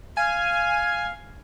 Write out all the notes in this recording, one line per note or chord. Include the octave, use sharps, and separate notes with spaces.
F5 G#5